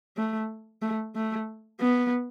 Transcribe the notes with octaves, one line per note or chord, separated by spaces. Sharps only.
A3
A3
A3
B3